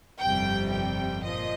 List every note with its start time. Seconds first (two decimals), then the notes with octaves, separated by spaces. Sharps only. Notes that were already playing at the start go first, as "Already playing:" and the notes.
0.20 G1 F2 C3 G3 G5
0.72 G5
1.24 A#2 F3 D#5